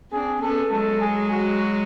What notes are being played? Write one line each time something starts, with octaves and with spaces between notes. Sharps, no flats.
C4 D4 G#4
B3 C#4 A4
F#3 G#3 A4
G#4
F#4